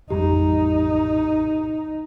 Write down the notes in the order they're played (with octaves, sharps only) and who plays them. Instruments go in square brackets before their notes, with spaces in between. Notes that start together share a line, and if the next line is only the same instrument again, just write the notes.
[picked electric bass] A1 F2 G3 [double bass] D#4 [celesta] G4 A#5